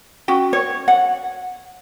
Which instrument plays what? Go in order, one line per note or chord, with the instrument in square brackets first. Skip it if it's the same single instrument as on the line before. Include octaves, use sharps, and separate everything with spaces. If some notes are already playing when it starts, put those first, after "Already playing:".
[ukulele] C#4 F#4 G5
C#5
F#5